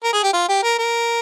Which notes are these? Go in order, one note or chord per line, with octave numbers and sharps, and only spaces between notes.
A#4
G#4
G4
F4
G4
A#4
A#4